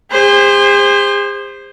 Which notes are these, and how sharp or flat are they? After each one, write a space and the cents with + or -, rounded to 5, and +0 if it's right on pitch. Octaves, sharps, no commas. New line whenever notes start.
G#4 -45 C5 +0